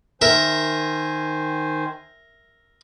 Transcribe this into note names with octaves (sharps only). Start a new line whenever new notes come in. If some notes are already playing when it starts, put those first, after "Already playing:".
D#3 A#4 C5 E5 G#5